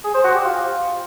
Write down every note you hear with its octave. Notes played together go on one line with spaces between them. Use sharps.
G#4
C5
F#4
G4
F4